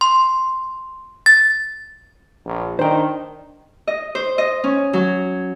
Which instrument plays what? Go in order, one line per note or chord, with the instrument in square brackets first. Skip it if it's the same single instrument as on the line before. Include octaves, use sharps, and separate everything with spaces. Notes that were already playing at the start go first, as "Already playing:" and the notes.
[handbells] C6
A6
[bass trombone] A#1
[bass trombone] D#3 [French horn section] D4 [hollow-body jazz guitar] C5 G5
[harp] D#5
C5
D#5
C#4
F#3